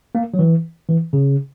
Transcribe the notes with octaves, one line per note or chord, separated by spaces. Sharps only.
A#3
F#3
E3
E3
C#3